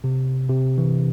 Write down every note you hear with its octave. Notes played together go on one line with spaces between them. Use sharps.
C3
C3
E3